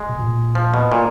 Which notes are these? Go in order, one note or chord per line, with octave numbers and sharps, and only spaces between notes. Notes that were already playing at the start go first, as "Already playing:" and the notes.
Already playing: G#3
B2
A#2
F3
B2
A#2